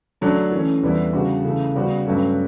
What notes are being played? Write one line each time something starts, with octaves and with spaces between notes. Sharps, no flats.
D3 F#3 A3 D4
E3 A3 C#4
E2 D3 G3 B3 E4
C#3 G3 D4 F#4
C#3 E3 A3
C#3 G3 B3 F#4
G2 F#3 A3 C#4